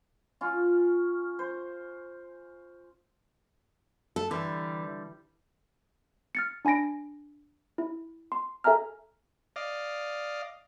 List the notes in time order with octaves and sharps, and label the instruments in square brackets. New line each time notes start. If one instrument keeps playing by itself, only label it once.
[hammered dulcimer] C#4 F4
C5
[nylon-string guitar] A4
[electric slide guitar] D3 G3 [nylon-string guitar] E3
[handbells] F6 A6 C#7
D4 G#5 B5 A#6 D7
E4
C6
A4 E5 G#5 A#5 F6
[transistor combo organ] D5 D#5 F5